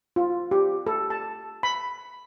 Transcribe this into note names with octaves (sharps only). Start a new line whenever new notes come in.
F4
G4
A4
A5
B5